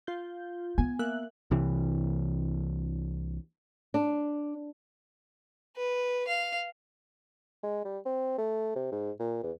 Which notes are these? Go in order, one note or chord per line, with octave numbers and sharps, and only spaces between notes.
F4 G6
B3 G#5
A#3 E5 F#6
C2 C3 E3
D4
B4
F5
G#3
G3
C4
A3
C3
G#2
A#2
E2